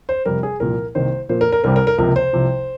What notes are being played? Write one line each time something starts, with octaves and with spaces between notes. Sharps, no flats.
C5
F2 C3 G3 A#4
G#4
C2 A#2 F3 A#4
C2 C3 D#3 A#3 C5
A#2 F3 A#3 C5
A#4
A#4
C2 C3 G3 C4 A#4
A#4
A#4
C#2 C3 F3 A#3 A#4
C5
C2 C3 F3